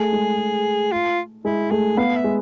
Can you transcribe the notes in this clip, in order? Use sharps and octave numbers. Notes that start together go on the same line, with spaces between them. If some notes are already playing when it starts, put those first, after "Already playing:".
Already playing: A3 G#4
G#3
F4
G#3 E4
A3 G#4
B3 F5
E5
G#3